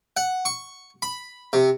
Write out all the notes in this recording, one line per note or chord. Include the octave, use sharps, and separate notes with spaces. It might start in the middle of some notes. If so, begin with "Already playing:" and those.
F#5
C#6
B5
C3